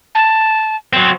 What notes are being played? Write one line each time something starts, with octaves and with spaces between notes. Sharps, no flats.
A5
F#3 C4